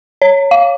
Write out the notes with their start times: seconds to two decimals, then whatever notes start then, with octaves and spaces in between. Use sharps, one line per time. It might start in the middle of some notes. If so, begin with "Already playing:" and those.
0.22 C#5
0.51 F5